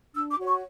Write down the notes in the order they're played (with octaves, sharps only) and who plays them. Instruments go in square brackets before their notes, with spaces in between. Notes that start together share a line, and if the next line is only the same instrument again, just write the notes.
[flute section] D4 E6
D6
F#4 C#5
C#6